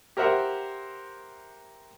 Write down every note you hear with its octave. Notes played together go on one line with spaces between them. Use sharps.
G4 A#4 C5 E5 F#5